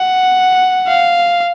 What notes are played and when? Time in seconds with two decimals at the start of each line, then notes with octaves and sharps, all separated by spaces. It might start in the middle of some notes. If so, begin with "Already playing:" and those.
Already playing: F#5
0.87 F5